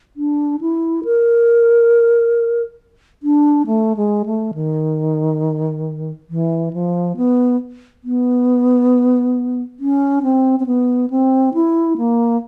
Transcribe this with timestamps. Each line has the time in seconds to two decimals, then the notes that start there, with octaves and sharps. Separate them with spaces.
0.17 D4
0.61 E4
1.05 A#4
3.23 D4
3.67 A3
3.96 G#3
4.26 A3
4.54 D#3
6.30 E3
6.73 F3
7.17 B3
8.04 B3
9.80 C#4
10.23 C4
10.60 C4
10.66 B3
11.10 C4
11.54 E4
11.98 A#3